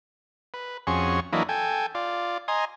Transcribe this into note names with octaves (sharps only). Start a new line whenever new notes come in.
B4
F2 C#4 F#4 G#4 C6 C#6
E3 F#3 A#3 D4 E4 D#5
A4 G5 G#5
F4 D5
D#5 G#5 A#5 C6